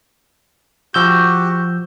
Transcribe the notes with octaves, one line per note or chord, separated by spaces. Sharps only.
F3 F#4 G4 E6 G6